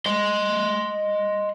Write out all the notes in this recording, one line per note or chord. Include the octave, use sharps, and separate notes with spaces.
D#5 C6